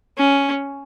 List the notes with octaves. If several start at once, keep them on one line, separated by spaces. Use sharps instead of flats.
C#4